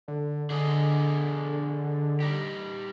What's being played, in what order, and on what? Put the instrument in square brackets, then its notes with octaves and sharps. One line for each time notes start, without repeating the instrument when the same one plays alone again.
[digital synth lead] D3
[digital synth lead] D3 [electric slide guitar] D4 G#4 D#5
[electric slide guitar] G3 D#4 G4